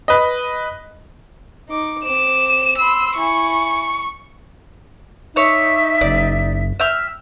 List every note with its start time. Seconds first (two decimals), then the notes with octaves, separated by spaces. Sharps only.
0.08 B4 D#5
1.69 D#4 D6
2.05 C4 D6 E7
2.78 B5 C6 E6
3.17 E4 G#5 C#6
5.36 D#4 C#5 E5 D6 E6
6.01 F#1 D5
6.80 E5 G5 F6